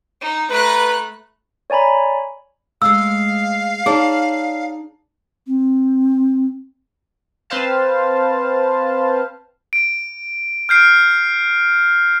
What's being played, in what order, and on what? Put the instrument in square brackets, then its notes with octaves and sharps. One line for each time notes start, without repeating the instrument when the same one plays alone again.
[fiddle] D#4
[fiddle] A3 F#6 [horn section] B4 [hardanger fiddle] A#5 B5
[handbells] C#5 D5 G#5 A#5 B5
[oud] G#3 A3 [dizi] F5 [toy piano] E6
[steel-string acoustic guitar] D#4 D5 A5 [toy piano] G#4 [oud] C#5
[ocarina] C4
[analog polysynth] C4 B4 C5 F5 A5
[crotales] D7
F6 G6 C7 D7